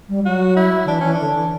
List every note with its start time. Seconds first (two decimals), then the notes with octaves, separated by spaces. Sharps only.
0.08 G3
0.25 F#3 F#4
0.56 E4
0.84 D3
0.87 E3 D4
1.01 E3 C#4
1.14 D4
1.19 D3
1.35 E3